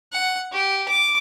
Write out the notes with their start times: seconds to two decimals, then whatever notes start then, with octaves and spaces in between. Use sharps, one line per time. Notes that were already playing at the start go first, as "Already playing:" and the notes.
0.12 F#5
0.52 G4
0.88 D6